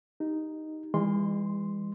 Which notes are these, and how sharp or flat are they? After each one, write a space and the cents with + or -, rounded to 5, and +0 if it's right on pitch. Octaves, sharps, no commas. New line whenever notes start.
D#4 +0 G4 +0
E3 +0 G#3 -45 C6 +0